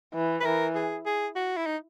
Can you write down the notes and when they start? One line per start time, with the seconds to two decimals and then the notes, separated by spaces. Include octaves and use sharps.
0.14 E3
0.40 B4
0.45 E3 A#4
0.75 G#4
1.06 G#4
1.36 F#4
1.57 E4
1.66 D#4